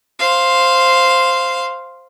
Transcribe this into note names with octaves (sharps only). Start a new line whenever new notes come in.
C5 F5